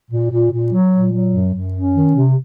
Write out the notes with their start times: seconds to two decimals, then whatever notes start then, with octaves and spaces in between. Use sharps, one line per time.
0.11 A#2
0.31 A#2
0.51 A#2
0.72 F#3
0.91 A#2
1.12 F#3
1.32 F#2
1.52 F#2
1.73 C#4
1.92 D#3
2.13 C3